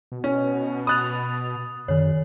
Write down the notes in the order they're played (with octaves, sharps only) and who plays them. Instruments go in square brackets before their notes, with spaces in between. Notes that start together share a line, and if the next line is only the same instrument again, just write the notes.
[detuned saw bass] B2
[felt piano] C#4
[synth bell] B5 A6 F7 [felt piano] D#6 F#6
[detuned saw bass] F#2 [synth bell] D#3 C#5